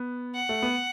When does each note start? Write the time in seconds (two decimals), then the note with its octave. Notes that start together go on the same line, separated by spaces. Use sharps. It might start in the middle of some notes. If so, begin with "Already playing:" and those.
Already playing: B3
0.35 F#5
0.49 A3
0.63 B3